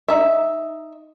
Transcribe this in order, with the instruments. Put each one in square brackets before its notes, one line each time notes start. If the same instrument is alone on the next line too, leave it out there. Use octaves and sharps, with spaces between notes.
[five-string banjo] D#4 E5